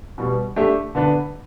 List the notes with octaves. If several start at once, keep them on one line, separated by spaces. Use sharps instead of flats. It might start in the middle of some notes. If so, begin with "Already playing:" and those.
B2 G3 B3
A3 D4 G4 E5
D3 B3 D4 B4